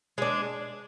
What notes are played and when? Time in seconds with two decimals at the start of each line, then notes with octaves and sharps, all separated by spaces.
0.18 G#3 D4